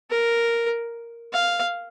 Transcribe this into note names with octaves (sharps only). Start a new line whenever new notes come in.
A#4
F5